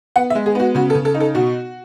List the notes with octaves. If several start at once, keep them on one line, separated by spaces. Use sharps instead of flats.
B3 F#5
E5
G#3
G#4
B3 F#4
C#3 F#4
A4
C#3
A4
D#4
A4
B2 F#4